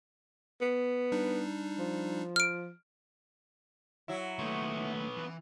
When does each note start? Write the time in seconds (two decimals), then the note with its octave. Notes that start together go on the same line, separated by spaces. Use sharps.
0.61 B3
1.12 G3 D4 D#4
1.78 F3
2.36 F6 D7
4.08 F#3 E4
4.39 D#2 A3 B3 C#5
5.17 E3